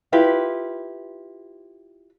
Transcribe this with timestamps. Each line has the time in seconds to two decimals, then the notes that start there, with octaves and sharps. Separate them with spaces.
0.12 E4 F4 G4 B4